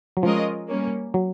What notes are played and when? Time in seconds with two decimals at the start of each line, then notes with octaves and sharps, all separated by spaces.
0.17 F#3
0.23 F3 G#3 C#4 F4 A#4 D#5
0.68 G3 A#3 C#4
1.14 F#3